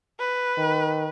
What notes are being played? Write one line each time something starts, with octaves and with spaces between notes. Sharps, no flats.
B4
D#3